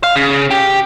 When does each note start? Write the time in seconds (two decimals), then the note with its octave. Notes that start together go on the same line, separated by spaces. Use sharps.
0.04 F5
0.16 C#3
0.51 G4